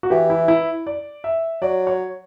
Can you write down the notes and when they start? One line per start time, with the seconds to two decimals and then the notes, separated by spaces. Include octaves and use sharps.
0.03 F#4
0.10 E3 G4
0.30 E4
0.48 E4
0.87 D5
1.24 E5
1.62 F#3 D5
1.87 C#5